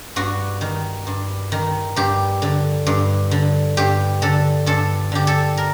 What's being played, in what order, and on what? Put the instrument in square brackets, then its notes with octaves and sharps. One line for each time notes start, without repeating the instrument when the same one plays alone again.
[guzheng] G2 F#4
D#3
G2
D#3
G2 G4
D3
G2
D3
G2 G4
D3 A4
G2 A4
D3 G4
A4
A#4